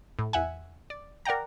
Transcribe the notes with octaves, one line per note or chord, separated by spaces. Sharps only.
A2
E2 E5 F#5 G#5
D5
A#4 D5 F#5 G5 A#5